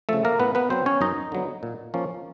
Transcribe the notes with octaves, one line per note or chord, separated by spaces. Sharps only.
C#3 F3 A3 A4
A#3 A#4
A2 B3 B4
B3 B4
F#3 B3 C4 C5
C#4 C#5
F#2 D#4 D#5
D3 F#3 B3
A#2
F3 A#3 C#4